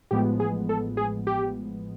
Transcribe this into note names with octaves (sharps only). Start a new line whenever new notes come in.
A1 A2 F3 G#3 B3 G4
G#4
A4
G#4
G4